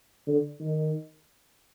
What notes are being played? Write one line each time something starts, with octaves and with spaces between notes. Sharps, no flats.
D3
D#3